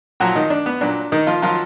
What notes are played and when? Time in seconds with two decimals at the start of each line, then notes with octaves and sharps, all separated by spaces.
0.20 A#2 F3 F#3 F#4
0.35 D#3 D#4
0.50 D4
0.66 B3
0.81 A#2 F#3 D4
1.12 D#3 D#4
1.27 F3 F4
1.42 D#3 F3 F#3 F4